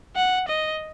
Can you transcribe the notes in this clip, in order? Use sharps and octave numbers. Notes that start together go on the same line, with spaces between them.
F#5
D#5